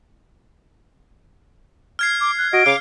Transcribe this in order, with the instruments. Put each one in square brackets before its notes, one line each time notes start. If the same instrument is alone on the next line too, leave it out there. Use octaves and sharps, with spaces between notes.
[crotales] F6 G#6 C7
[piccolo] D6
F#6
[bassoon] F#4 [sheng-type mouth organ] D#5 [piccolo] D7
[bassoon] C#3 [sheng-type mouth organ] F5 D6 [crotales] F6